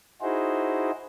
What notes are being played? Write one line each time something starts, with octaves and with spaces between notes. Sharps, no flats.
D#4 E4 F#4 G#4 C5